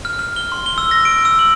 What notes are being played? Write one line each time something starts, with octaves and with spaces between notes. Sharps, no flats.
F6
F6
G7
C6
G7
E6
A#6
D7
E6
F#7